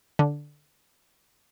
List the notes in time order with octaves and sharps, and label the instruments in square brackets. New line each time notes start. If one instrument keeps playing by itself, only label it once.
[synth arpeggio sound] D3